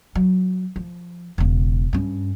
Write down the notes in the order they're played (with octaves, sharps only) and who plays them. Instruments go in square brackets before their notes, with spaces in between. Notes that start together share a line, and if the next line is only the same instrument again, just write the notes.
[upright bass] F#3
F3
E1 C#3
G2 C#4